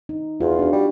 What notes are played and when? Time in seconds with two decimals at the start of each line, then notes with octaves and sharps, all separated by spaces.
0.09 D#4
0.41 E2 F4
0.59 D4 F#4
0.72 G3